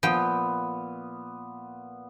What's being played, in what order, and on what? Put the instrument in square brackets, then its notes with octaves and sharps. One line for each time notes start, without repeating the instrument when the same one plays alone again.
[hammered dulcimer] A#2 B3 [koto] F3 G5